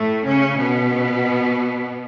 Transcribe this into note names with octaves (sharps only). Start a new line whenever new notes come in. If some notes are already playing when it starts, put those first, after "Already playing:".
Already playing: A2 A3
C#3 C#4
B2 B3